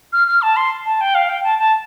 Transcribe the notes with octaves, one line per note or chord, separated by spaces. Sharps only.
F6
F6
A5
C6
A5
G5
F5
G5
A5
A5